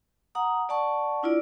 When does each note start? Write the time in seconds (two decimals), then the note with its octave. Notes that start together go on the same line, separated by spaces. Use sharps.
0.35 F#5 A#5 D#6
0.69 D5 F#5 A5 C#6
1.23 D4 E4 F4 D5